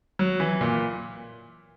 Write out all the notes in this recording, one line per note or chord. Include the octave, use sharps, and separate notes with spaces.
F#3
E3
A#2